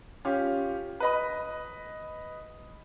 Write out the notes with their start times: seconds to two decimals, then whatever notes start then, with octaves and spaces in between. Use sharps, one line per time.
0.25 C#4 F4 G4
1.00 B4 D#5 B5